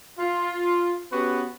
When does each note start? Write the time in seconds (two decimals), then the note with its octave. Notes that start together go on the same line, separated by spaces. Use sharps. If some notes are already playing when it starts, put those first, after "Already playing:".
0.19 F4
1.12 B3 C#4 F#4 G4 B4